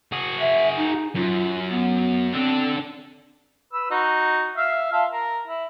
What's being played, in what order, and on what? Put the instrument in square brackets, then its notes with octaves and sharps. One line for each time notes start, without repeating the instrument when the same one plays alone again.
[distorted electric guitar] F#4 G#4
[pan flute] E5
D#4
[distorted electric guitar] F#2 [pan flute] F4
[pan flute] B3
[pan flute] C4 [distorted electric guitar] D4 A4
[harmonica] B4 E6
D#4 F#4
E5 F5
F4 E5 A5
A#4
E4